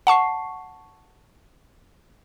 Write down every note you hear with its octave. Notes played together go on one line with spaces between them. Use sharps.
F#5 A5 C#6 C7